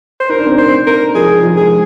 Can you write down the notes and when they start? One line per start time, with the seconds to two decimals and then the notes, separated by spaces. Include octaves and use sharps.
0.20 C5
0.29 D#4 A#4
0.39 D4
0.46 C4
0.55 D4 C5
0.87 A#4
1.15 F3 G#4
1.43 F3
1.57 G#3 G#4